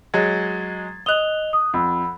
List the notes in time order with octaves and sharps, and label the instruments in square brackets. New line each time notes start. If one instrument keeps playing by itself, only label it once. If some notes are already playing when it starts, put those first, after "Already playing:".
[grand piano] F#3 G#3 [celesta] G#6 A6
[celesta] D#5 F7 G7 [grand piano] D#6 F#6
[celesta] D#6
[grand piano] F2 [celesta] F#5 B5 E6